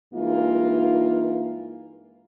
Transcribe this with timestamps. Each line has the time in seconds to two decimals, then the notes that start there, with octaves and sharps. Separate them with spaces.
0.13 G2 E3 G#3 A#3 D#4 F4